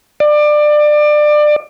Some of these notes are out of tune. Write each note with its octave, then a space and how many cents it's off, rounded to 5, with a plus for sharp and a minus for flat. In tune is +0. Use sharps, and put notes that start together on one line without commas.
D5 +25